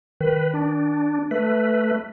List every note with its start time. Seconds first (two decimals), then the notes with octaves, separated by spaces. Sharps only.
0.21 D#3 B4
0.54 D4
1.31 A3 B4 B6